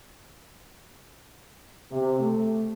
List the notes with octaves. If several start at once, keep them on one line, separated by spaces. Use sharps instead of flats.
C3
A3